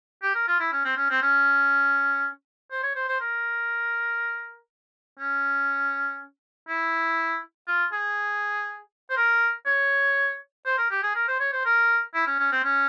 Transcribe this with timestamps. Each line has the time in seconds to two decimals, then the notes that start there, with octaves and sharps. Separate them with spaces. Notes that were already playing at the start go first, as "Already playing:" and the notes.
0.23 G4
0.35 A#4
0.47 F4
0.60 E4
0.72 C#4
0.85 C4
0.97 C#4
1.10 C4
1.22 C#4
2.71 C5
2.83 C#5
2.95 C5
3.08 C5
3.20 A#4
5.19 C#4
6.68 E4
7.67 F4
7.92 G#4
9.10 C5
9.16 A#4
9.66 C#5
10.65 C5
10.78 A#4
10.90 G4
11.02 G#4
11.15 A#4
11.28 C5
11.40 C#5
11.52 C5
11.65 A#4
12.14 E4
12.27 C#4
12.39 C#4
12.52 C4
12.64 C#4